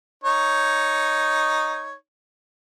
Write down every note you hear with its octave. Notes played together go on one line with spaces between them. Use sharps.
D#4 C#5